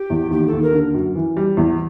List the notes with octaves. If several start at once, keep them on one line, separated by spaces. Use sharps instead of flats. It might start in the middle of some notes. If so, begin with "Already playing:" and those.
Already playing: G4
E2
D#2 G4
A4
D#2
A#4
D3
F#2
E3
G3
E2